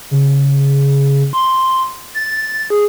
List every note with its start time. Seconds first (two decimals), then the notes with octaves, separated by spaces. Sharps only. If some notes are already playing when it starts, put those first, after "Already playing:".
0.11 C#3
1.33 C6
2.15 A6
2.70 G#4